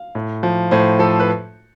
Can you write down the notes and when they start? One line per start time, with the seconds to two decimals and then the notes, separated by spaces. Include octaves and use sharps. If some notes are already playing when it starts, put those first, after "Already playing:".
Already playing: F5
0.15 A2
0.43 F3
0.71 A2 C5
0.99 F3 A4
1.20 B4